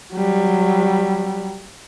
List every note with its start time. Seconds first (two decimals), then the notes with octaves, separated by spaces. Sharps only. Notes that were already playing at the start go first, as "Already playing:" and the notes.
0.14 F#3 G3